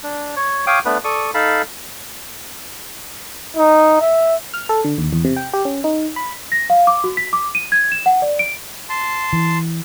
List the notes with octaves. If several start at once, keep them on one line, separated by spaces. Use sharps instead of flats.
D4
C#5
C#5 F5 G5 D6 D#6
A3 B3 D4 B4
A4 D5 C#6 D#6
D#4 A4 F5 A5 B5
D#4
E5
F6
A4
D3
D#2
E2
C3
G5
G4
C#4
D#4
B5
A#6
F5
D6
F#4
B6
D6
D#7
G#6
E7
F#5
D5
D7
A5 C6
E3